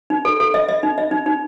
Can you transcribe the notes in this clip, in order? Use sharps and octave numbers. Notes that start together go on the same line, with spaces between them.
D#4
A4
A4
D#5
D#5
D#4
D#5
D#4
D#4